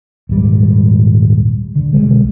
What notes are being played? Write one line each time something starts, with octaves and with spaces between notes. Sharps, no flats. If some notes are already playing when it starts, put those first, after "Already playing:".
D#1 G#2 G3
D3
B1 F2 G3 G#3